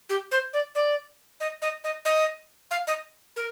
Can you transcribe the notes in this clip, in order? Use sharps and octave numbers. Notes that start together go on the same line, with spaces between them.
G4
C5
D5
D5
D#5
D#5
D#5
D#5
F5
D#5
A#4